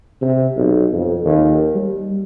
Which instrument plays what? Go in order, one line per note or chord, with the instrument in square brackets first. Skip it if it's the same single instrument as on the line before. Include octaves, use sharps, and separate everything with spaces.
[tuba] C3
B1
F2
D#2
G3